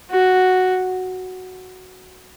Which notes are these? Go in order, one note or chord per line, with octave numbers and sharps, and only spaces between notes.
F#4